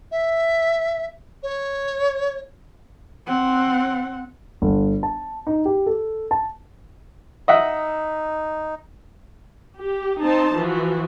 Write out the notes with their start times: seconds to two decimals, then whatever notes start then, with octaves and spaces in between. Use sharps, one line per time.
0.11 E5
1.43 C#5
3.26 C4 F#5
4.62 G1
5.03 A5
5.47 D#4
5.65 G4
5.86 A4
6.31 A5
7.48 D#4 D#5 E5 F#5
9.77 G4
10.22 C4 D#4 C5 A5
10.54 E3 F3 F#4